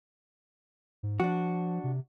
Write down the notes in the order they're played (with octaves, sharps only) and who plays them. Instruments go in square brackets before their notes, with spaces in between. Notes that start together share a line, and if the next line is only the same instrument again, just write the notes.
[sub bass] G#2
[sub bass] F3 [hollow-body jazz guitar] D4 F#4
[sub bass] C3